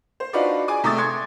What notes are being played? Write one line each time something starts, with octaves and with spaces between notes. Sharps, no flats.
C5
D4 D#4 F4 F#4 B4 D5
G#4 D5 G#5 D6
C3 A3 D6 D#6 A6
C6 G#6 C#7